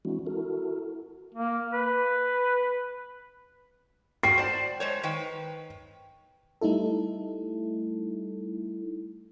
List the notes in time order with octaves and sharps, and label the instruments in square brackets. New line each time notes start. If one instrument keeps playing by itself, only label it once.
[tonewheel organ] E3 G#3 C4 D4 E4 F#4
E4 F#4 A4 A#4
[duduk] A#3
B4
[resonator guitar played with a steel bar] F#4 G5 [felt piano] C7
[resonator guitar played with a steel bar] C5 D5 A5
G#3 C5 C#5
D#3 B4 G5
[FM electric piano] G3 A3 D#4 E4 A4